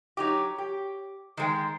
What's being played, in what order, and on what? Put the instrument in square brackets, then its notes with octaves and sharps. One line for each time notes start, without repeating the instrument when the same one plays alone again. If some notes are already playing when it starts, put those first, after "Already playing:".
[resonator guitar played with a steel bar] F#3 D#4 G4 [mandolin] C#5 D6
[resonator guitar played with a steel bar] G4
[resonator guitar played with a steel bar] D#3 G#3 G5 [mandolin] C5